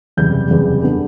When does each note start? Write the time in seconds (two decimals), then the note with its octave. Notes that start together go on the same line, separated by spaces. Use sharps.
0.17 F#1 E2 C3 G3 G6
0.50 F#1 E2 C3 G3
0.83 D3 G3 B3